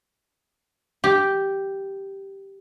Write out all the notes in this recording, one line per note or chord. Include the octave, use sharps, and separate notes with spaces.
G4